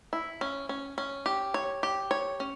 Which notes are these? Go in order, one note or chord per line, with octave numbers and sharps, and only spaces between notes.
E4
C#4
C#4
C#4
G4
C#5
G4
C#5
C#4